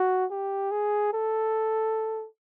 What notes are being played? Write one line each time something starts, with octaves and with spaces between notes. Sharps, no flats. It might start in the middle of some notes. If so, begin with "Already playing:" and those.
Already playing: F#4
G4
G#4
A4